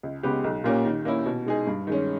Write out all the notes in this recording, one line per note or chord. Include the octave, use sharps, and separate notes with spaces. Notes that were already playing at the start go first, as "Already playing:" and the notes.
C#2
C#3 G#3 B3 G4
B1
A#2 A#3 C#4 G4
D#3
A#3 C#4 E4
B2
G#3 D#4 G#4
G2
D#3 G#3 C#4